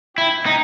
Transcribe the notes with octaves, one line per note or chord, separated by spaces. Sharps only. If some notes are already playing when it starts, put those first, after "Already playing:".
E4 G5
D#4